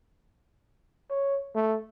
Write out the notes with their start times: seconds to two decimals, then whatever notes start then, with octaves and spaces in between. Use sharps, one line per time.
1.10 C#5
1.55 A3